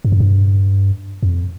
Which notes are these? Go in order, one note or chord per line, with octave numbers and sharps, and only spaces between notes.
G2
F#2
G2
F2